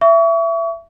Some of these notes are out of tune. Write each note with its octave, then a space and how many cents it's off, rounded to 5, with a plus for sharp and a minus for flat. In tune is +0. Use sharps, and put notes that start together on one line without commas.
E5 +20 C#6 +35